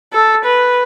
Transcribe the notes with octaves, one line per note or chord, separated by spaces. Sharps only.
A4
B4